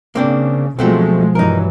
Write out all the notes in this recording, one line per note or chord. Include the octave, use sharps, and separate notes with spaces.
C#3 A#3 C4 D4
B2 F3 F#3 G#3 A3 C4
G2 E3 F#3 D#4 A#4